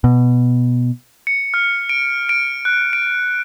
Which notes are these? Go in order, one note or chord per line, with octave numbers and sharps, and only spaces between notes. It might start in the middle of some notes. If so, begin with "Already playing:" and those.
B2
C#7
F6
D7
D7
F#6
D7